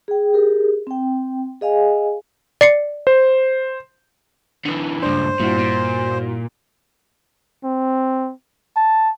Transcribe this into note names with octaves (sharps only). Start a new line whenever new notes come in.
G#4 G5
G4 G#4 A#4
C4 G5
G#4 D#5 F5 G#5
D5 C7 C#7
C5
D3 E3
C#2 G2 A#2 D4 C5
G2 A#2 E4 F#4
A#2
C4
A5